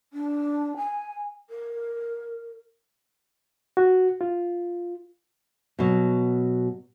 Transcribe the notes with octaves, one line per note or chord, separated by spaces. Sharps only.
D4
G#5
A#4
F#4
F4
B2 F#3